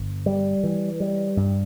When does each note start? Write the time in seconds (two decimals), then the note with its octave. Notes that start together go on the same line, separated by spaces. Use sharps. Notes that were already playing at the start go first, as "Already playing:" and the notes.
Already playing: G1
0.26 G3
0.64 E3
1.00 G3
1.37 G2